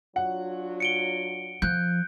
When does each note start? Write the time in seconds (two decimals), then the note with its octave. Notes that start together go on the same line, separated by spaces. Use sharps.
0.16 F#3 D4 F4 F#5
0.80 C#7 D7 G7
1.62 F3 F#6 G6